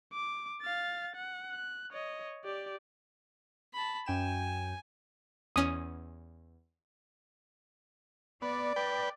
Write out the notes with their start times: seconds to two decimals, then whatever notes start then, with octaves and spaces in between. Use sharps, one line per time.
0.13 D6
0.61 F5 A6
1.16 F#5
1.51 F#6
1.91 C#5 D#5
2.44 G4 D5
3.73 A5 B5
4.06 F#2 G5 G#5 E7
5.56 E2 C#4 D#6
8.42 B3 D5
8.76 B4 G5